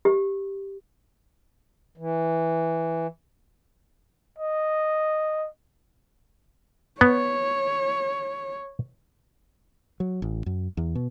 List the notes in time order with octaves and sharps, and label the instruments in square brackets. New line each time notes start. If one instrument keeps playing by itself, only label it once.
[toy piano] G4
[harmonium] E3
[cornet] D#5
[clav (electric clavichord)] B3 [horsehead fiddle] C#5
[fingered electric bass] F#3
A1
F#2
E2
B2